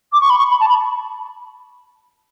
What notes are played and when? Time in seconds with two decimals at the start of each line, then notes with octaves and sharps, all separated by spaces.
0.12 D6
0.20 C#6
0.29 B5
0.38 C#6
0.50 B5
0.60 A5
0.69 B5